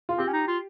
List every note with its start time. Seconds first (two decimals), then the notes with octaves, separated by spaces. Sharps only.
0.09 F4
0.18 C4 G4
0.28 C#4
0.33 D#4
0.47 F4